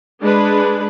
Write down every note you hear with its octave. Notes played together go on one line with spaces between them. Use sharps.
G#3 D4 B4